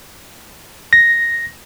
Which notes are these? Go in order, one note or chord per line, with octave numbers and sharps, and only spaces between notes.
A#6